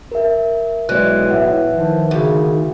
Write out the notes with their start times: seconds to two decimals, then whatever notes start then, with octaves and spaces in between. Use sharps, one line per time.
0.12 A#4 E5
0.89 B1 E3 G#3 C#5 D5 F#6
1.31 A2 E5 F#5
1.74 D#3 F3
2.11 D2 C#3